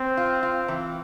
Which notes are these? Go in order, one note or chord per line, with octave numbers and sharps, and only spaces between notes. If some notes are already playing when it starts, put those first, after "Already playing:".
Already playing: C4
F4
F4
E3